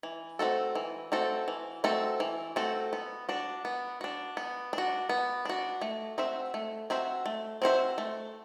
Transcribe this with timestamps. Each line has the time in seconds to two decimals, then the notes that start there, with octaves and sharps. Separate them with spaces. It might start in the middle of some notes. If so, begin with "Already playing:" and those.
0.03 E3
0.39 A3 C4 F#4 A4
0.75 E3
1.12 A3 C4 F#4 A4
1.48 E3
1.84 A3 C4 F#4 A4
2.20 E3
2.56 A3 C4 F#4 A4
2.93 B3
3.29 D4 F#4
3.65 B3
4.01 D4 F#4
4.37 B3
4.73 D4
4.78 F#4
5.09 B3
5.45 D4 F#4
5.81 A3
6.18 C4 F#4 C5 E5
6.54 A3
6.90 C4 F#4 C5 E5
7.26 A3
7.62 C4 F#4 C5 E5
7.98 A3